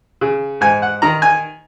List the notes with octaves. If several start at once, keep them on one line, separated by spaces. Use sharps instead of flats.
C#3
G#2 G#5
F#5
D#3 A#5
G#5